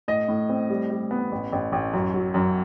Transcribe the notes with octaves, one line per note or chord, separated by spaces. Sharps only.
A2 D#5
A2
C4
G3
G3
B3
A1
A1
A1
F#2
F#3
F#2